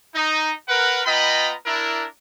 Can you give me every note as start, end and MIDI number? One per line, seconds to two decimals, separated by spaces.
0.14 0.52 63
0.69 1.01 70
0.69 1.01 71
0.69 1.01 78
1.06 1.53 59
1.06 1.53 65
1.06 1.53 75
1.06 1.53 79
1.06 1.53 82
1.06 1.53 83
1.66 2.05 62
1.66 2.05 64
1.66 2.05 70